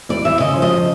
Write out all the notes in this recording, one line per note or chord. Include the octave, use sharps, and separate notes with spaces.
E2 D5
E2 E5
C#3 D#5
F3
D#5